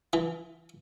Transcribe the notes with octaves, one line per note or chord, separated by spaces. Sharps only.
E3